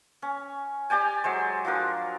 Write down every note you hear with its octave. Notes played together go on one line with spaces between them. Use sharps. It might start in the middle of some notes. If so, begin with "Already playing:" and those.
C#4
G4 D5 G5 G#5
F#3 G#3 C5
F3 F#3 D4 A#4